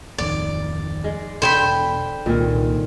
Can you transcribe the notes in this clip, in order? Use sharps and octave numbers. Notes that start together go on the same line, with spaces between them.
D1 F2 D#3 D5
G#3
E2 B2 D3 C5 G5 B5
C2 A#2 D3 D#3 G#3 A#3